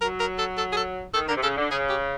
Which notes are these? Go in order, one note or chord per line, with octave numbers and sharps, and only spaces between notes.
F#3 A#4
A#4
A4
A4
G#4
A4
D#3 A4
D3 A#4
C3
C#3 A4
D3
C#3 G#4
G4